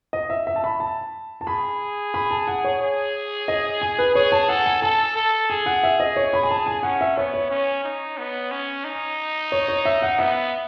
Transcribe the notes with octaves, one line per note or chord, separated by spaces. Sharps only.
D#5
E5
E5
A5
B5
A5
A5
G#4 B5
B5
A5
F#5
C#5
G#4
D#5
G#5
B4
G#4 C#5
A5
A4 F#5
G#5
A4 A5
A4
G#4 G#5
F#5
E5
D#5
C#5
B5
G#5
A5
G#5
C#4 F#5
E5
B3 C#5
C#5
C#4
D#4
B3
C#4
D#4
C#5
C#5
E5
F#5
B3 E5